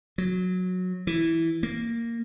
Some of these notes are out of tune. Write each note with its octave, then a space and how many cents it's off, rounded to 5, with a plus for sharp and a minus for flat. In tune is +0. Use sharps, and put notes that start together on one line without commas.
F#3 -15
E3 -5
A#3 -10